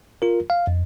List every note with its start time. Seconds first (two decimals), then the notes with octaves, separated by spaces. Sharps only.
0.22 F4 A#4
0.50 F5
0.67 F2